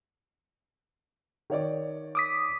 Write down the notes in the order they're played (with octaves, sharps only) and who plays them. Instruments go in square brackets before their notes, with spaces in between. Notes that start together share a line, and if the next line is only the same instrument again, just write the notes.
[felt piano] D#3 C#5 D5
[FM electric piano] D6 D#6 B6